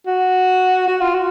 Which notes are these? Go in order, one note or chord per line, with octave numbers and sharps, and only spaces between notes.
F#4
F#4
F4
F#4